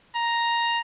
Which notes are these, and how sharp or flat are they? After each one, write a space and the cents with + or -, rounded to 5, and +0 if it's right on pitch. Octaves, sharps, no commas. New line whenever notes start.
A#5 +5